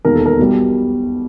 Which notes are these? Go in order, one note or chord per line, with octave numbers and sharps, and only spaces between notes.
E1 D#2 D#3 A#4
A4
A#4
B1 B2 G3